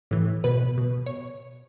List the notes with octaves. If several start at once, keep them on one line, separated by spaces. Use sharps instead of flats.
A2 E3
B2 B4
B2
C#5